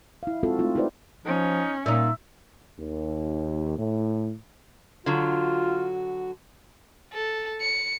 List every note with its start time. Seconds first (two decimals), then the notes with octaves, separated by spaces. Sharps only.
0.23 E4 F5
0.43 G#3 C4 F4 F#4 A4
0.59 A3 C4 D#4 F4
0.75 D#4 E4 G4 B4 C5 D5
1.26 F3 C#4 D#4
1.86 A#2 A#3 D#4 E5
2.79 D#2
3.78 A2
5.06 D3 F#3 F4 F#4
7.13 A4
7.61 C#7